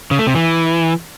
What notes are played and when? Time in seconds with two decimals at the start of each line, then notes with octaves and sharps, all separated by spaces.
0.11 C#3
0.19 A3
0.27 C3
0.35 E3